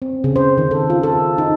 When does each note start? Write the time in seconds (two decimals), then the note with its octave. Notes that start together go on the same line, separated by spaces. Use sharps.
0.02 C4
0.24 C#3
0.36 C5
0.58 D#3
0.71 A4
0.90 F4
1.03 A4
1.38 D#4